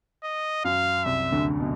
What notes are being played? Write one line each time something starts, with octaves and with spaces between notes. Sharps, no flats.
D#5
F#2 F#3 F5
C2 C3 E5
D2 D3
B2